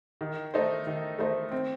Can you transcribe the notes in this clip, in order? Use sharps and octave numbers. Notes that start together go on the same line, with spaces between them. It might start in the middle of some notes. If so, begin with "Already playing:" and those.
D#3
A3 D#4 A4 C5
D#3
A3 D#4 A4 C5
C4